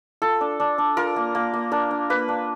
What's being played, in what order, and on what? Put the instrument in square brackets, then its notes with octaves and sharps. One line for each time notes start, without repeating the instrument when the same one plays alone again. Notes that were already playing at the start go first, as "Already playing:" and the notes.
[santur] F4 A4
D4
D4
D4
F4 A#4
A#3
A#3
A#3
D4 A#4
D4
A#3 B4
D4